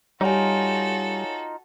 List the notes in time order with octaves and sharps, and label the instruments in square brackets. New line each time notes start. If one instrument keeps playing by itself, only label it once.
[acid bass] G3 [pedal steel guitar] D#4 F4 [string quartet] F#4 A4 [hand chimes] C#5 G#5